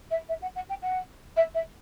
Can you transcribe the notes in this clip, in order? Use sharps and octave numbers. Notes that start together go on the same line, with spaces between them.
E5
E5
F#5
F#5
G5
F#5
E5
E5